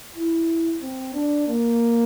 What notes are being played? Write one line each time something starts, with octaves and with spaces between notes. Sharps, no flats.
E4
C4
D4
A#3